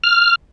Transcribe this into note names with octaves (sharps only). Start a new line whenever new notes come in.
F6